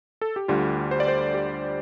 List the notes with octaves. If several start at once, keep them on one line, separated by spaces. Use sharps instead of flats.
A4
G4
D2 D3 G3 F4
C5
D5
C5
G4